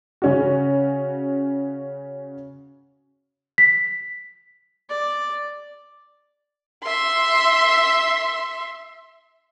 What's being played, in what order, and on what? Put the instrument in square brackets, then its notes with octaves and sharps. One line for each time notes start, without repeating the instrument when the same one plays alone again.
[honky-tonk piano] C#3 C#4 F#4
[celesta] B6
[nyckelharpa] D5
[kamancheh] E5 C6